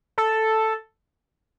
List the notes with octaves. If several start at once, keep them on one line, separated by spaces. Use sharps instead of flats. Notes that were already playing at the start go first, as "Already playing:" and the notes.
A4